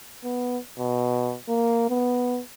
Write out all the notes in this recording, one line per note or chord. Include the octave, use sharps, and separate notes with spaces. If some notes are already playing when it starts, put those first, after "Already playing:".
B3
B2
A#3
B3